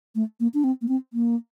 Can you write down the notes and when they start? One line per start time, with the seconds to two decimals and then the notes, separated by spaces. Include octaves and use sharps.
0.15 A3
0.40 A#3
0.54 D4
0.64 C4
0.82 A#3
0.88 C4
1.13 A#3